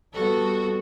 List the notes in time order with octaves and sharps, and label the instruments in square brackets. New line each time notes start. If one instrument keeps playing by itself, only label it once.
[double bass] G3 B3 [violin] F#4 A4